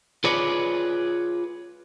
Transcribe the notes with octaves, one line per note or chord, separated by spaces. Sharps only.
F4 G#4 B4 C#5 D5